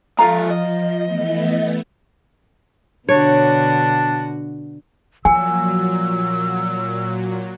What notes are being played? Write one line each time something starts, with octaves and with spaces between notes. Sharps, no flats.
F3 G#3 F4 A4 F5 A#5
D#5
E3 A3 B3
B2 D3 D4 F#4 C#5
A#2 F3 F#3 G#5 E6